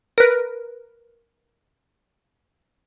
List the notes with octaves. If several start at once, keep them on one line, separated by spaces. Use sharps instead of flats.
A#4 B4